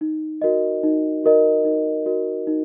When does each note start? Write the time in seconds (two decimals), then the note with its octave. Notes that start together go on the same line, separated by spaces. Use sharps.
0.01 D#4
0.42 F#4 A#4 D#5
0.83 D#4
1.24 F#4 A#4 D#5
1.65 D#4
2.06 F#4 A#4 D#5
2.47 D#4